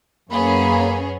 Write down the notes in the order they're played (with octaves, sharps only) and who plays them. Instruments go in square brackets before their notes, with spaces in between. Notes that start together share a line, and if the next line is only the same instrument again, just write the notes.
[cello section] F#2 C#4 [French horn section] A#3 [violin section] B3 G#4 C#5 [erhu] B5